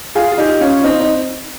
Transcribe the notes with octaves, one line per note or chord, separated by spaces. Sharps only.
F4 G#4
F4
D#4 G4
C#4 F4
C4 D#4
D#4